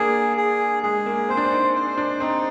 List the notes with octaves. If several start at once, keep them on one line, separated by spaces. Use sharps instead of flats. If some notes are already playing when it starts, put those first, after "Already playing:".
Already playing: A#3 D4 G#4
G#4
G#3 G#4
A#3
C4 C5
D4
C4
D#4
C5
D4
C4 D#4